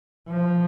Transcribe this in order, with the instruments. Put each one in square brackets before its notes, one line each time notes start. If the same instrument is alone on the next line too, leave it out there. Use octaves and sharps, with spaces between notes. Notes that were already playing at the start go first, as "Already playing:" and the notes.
[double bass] F3